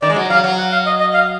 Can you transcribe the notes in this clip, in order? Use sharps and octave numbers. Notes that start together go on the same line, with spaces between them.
D#3 D5
G#3
F#3
F#3 F5
F#3
F#5
F5
D#5
D#5
F5